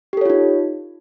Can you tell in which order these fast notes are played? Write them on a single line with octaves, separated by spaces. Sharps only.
G4 A4 C#5 F4 D#4